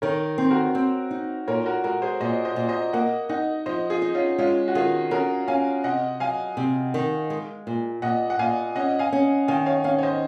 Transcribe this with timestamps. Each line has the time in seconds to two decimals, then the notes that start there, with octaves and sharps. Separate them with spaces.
0.02 D#3 A#4 C#5
0.38 C4
0.50 F#4 A#4
0.75 C4
1.11 D#4
1.47 A#2 A#4 C#5
1.66 F#4 A#4
1.84 G#3 F#4 A#4
2.02 G#4 C5
2.21 A#2 C5 D#5
2.45 C5 D#5
2.56 A#2
2.69 C5 D#5
2.93 A#3 D#5 F#5
3.29 D#4 D#5 F#5
3.66 F3 C5 D#5
3.90 F4 G#4
4.02 D#4
4.15 C#4 F4
4.38 G#3 C#4 F4
4.68 F#4
4.75 D#3 F4 G#4
5.11 C#4 F#4 A#4
5.48 C#4 F5 G#5
5.84 C3 D#5 F#5
6.20 F#3 F5 G#5
6.57 C3
6.94 D#3
7.30 G#3
7.67 A#2
8.02 A#2 D#5 F#5
8.30 F#5
8.39 A#2 F5 G#5
8.76 C#4 D#5 F#5
8.99 F5 G#5
9.13 C#4
9.48 D#3 F5 G#5
9.66 C#5 F5
9.84 C#4 C#5 F5
9.99 C#5
10.03 C5 D#5